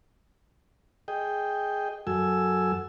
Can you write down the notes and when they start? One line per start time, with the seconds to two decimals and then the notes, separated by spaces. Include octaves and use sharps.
1.08 G#4 D#5 G5
2.07 F#2 F#3 A4 G#5 E6